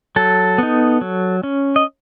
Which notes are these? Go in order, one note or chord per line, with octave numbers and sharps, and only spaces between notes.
F#3 A4
B3 D#4
F#3
C#4
D#5